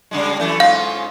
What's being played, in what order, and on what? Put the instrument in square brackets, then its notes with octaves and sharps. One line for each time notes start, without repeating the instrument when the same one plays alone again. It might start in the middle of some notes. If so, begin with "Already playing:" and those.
[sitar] C#3 G3 G#3
F#2 E3 A3
[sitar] G#2 C#4 F4 [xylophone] F5